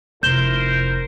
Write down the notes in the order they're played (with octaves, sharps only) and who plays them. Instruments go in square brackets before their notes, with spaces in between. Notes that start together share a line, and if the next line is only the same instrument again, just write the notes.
[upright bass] F1 [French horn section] E4 A#4 C5 [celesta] G6 E7 G7